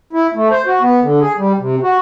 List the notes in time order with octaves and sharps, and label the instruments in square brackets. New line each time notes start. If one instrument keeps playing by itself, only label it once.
[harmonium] E4
A3
C5
F#4
B3
D3
G#4
G3
C3
F#4